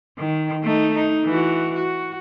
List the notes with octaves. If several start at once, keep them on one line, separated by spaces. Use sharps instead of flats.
D#3
A3 D#4
D#4
E3 F#4
F#4